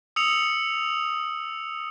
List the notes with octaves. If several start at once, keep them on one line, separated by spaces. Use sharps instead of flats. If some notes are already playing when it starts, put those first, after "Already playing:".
D#6 E6 C#7 F7